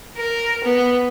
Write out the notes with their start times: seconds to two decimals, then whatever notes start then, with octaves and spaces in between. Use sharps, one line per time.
0.17 A#4
0.64 B3